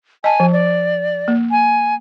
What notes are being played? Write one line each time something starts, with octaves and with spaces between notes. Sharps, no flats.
D#5 G#5 A5
F3
D5
A#3
G#5